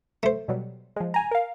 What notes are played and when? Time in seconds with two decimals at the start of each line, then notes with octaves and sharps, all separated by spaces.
0.23 A3 C5
0.48 B2 F#3 G3
0.96 F3 G#3
1.14 G#5 A#5
1.31 A#4 F5